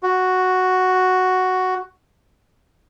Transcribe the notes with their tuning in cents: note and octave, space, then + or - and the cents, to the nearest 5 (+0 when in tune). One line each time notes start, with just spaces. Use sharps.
F#4 +0